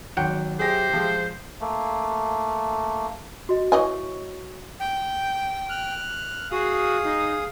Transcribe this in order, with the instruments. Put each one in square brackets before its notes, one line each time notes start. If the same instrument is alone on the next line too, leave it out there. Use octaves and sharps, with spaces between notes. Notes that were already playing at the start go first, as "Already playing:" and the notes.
[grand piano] G#1 [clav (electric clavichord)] F#3 F#5 G5
[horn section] G4 E5 [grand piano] G#4 A#6 [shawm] C5
[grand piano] F3 G#3
[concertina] A3 A#3
[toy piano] F#4 D#5
[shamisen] E3 D#5 G#5 [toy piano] C#5 C#6
[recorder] G5
[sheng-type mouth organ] F6 F#6
[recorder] F#4 [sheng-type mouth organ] G#4 F5 D#6
[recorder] D#4